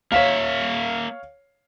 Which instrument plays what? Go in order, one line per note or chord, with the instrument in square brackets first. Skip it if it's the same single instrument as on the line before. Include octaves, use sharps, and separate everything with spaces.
[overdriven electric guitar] A#3 E5 [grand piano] C#5 F5